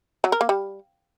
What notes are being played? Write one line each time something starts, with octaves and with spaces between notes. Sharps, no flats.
F#3
A#4
A#3
G3